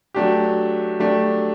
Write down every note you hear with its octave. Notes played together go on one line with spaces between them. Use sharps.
F#3 A3 D4 G4
F#3 A3 D4 G4